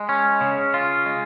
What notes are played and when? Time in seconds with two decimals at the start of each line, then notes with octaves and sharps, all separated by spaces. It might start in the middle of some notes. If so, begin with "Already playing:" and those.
Already playing: G#3
0.09 C#4
0.41 C#3
0.74 F4
1.06 G#3